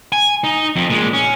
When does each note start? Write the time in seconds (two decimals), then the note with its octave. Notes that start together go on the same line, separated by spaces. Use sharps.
0.12 G#5
0.44 D#4
0.76 F2
0.90 A#2 G#3
1.13 C#4